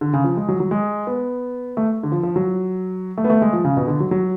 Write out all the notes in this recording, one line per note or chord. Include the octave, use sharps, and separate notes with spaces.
D3
C#3
F3
G#3
F#3
F#3
G#3
B3
A3
D3
F3
F3
F#3
A3
B3
A3
G#3
F3
C#3
B2
D3
F#3
F#3